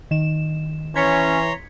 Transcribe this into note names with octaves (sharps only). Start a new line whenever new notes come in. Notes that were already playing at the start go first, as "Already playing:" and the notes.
D#3 E7
E3 C#4 C#5 A#5 C6 G#6 B6 C#7